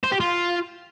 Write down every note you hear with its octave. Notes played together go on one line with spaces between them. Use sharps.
C5
G4
F4